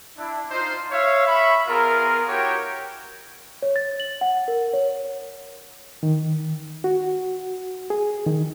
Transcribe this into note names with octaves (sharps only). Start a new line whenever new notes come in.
D4 E4
D#4 F4 C5
C#5 E5 F5
E5 B5 C#6
B3 F4 G#4 A#4
E4 F#4 G4 A#4 C#5 G5
C#5
A6
F#7
F#5
A#4
C#5
D#3
F#4
G#4
D#3